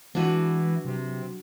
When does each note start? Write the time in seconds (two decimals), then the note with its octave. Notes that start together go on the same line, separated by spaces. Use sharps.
0.15 E3 G#3 D4 F#4 B4
0.85 C3 F#3